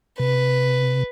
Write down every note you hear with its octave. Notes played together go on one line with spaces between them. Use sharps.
C3 B4